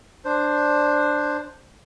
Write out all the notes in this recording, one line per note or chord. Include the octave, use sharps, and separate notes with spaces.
D4 C5